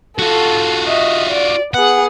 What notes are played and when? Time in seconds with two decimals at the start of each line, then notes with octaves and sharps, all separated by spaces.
0.19 F4 F#4 A4
0.86 D#5 E5
1.30 D5
1.74 B3 G#4 F#5